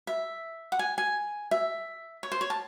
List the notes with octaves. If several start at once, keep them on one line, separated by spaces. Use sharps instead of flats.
E5
F#5
G#5
G#5
E5
C#5
C5
C#5
A5